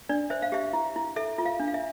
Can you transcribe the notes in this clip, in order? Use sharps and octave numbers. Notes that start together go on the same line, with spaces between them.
D4 D5
C5 E5
F5
G4 E5
E4
E4
A4 E5
F4
F5
D4
F5
E5